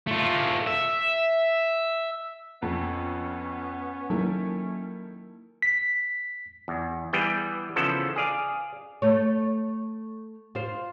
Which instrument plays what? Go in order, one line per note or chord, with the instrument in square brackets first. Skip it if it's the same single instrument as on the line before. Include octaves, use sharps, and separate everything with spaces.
[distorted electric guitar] A3 F4
E5
[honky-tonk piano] F2 [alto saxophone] B3 [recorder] C#4
[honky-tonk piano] D#3 E4 A4 [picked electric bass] F#3 A#3
[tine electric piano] B6
[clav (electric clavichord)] E2
E3 G3 B3 G#4 G5
C#3 E3 F3 B3 A4 C5
G#4 D5 F5
[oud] A3 C#5
F4 C5